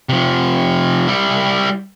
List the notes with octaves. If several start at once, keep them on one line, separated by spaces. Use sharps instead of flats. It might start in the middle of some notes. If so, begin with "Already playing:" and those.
C3 F3
G3 E4